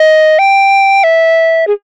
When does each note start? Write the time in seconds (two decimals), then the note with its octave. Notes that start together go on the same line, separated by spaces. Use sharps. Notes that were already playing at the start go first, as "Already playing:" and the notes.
Already playing: D#5
0.39 G5
1.04 E5
1.67 G#4